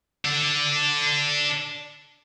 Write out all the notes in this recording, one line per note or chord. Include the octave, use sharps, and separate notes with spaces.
D4 A4